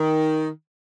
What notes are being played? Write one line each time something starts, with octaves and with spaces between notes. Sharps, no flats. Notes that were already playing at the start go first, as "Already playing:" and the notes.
Already playing: D#3